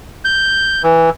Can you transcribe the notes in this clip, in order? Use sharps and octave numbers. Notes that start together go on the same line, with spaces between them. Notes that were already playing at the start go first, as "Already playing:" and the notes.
G6
E3